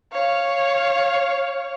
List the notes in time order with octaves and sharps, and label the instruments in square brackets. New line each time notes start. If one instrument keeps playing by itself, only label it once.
[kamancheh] C#5 F5